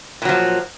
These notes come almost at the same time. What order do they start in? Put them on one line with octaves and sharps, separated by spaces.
A#2 F#3 F3